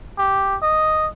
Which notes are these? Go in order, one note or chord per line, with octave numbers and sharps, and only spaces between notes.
G4
D#5